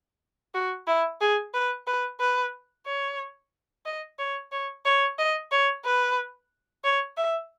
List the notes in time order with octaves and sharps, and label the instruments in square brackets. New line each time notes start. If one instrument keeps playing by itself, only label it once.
[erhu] F#4
E4
G#4
B4
B4
B4
C#5
D#5
C#5
C#5
C#5
D#5
C#5
B4
C#5
E5